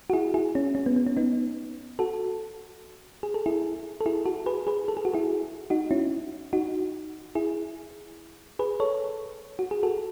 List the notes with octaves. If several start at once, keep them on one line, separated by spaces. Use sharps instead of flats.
F#4
E4 G#4
E4 G#4
C#4
C#4
B3
B3
C#4
B3 D#4
F#4 A4
G#4
A4
E4 G#4
A4
E4 G#4
F#4 A4
G#4 B4
G#4 B4
A4
G#4
F#4
E4 G#4
D#4 F#4
C#4 E4
D#4 F#4
E4 G#4
G#4 B4
A4 C#5
F#4
G#4
F#4 A4